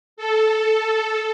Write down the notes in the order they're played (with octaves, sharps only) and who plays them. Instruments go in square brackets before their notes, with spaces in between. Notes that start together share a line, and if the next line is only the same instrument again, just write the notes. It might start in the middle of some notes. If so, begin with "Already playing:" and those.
[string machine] A4